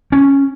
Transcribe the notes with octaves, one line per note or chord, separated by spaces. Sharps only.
C#4